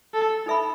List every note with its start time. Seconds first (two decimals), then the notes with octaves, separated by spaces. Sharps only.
0.14 A4
0.46 D#4 A4 E5 B5